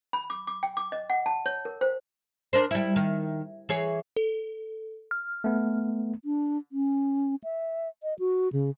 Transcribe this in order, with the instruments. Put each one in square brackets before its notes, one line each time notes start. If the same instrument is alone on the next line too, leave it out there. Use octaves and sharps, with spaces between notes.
[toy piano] B5
D6
D6
G5
D6
D#5
F#5
A5
C#5
A#4
C5
[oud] D4 A#4 C5
G3 E4
D#3
E3 G#4 C#5
[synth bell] A4
F6
[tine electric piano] A3 B3
[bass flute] D4
C#4
E5
D#5
F#4
C#3